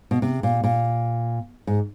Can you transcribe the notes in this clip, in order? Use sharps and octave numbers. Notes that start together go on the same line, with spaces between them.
B2
C3
A#2
A#2
G#2